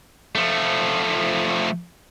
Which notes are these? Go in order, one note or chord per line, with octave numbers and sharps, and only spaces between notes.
F3 A3